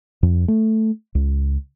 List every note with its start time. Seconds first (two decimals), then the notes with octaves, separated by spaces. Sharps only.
0.23 F2
0.48 A3
1.15 C#2